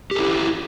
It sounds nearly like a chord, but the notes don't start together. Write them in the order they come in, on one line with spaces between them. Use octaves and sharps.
G4 A4 E4